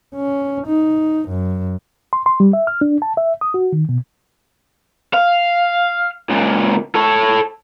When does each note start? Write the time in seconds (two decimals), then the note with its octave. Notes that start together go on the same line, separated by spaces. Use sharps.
0.16 C#4
0.67 D#4
1.29 F#2
2.13 C6
2.26 C6
2.40 G3
2.53 E5
2.67 F6
2.81 D4
3.02 A5
3.17 E5
3.41 D#6
3.54 F#4
3.72 D#3
3.89 B2
5.14 F5
6.30 C#2 A#2
6.95 A4 C#5